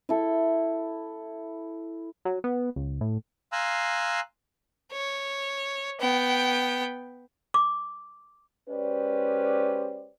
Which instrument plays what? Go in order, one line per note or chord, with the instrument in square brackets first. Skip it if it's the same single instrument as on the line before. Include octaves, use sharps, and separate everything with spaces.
[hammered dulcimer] E4 A4
[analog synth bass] F#3
B3
C#2
A2
[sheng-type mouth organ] F5 G#5 A#5 C6 E6 F#6
[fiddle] C#5
B3 G5
[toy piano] D6
[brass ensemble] G#3 C#4 G4 B4 C5 D5